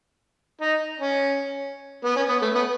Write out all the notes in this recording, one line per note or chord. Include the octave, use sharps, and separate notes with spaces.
D#4
C#4
B3
C#4
B3
A3
B3